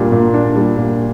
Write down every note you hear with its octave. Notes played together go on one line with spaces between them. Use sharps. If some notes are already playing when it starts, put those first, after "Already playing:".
Already playing: A#2 G3 D4
A#2
D4
G3
A#2